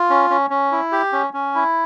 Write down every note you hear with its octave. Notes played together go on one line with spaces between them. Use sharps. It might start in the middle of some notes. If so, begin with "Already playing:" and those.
Already playing: F4
C#4
C#4
C#4
E4
G4
C#4
C#4
E4